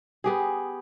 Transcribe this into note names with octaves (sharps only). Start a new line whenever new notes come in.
B3 G4 G#4